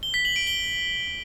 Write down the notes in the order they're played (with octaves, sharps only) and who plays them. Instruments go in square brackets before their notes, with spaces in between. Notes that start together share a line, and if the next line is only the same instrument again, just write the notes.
[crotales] G7
B6
F#7
D7
G7